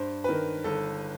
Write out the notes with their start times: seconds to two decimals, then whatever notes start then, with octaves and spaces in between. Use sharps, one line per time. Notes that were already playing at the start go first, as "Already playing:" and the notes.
Already playing: G2 C5
0.24 B4
0.29 D#3 A#4
0.64 G1 A4